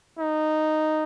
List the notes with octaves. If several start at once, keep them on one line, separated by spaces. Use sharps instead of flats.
D#4